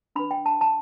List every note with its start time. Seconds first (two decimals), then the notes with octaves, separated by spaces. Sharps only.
0.16 D4 B4 B5
0.31 G5
0.46 A5
0.61 A5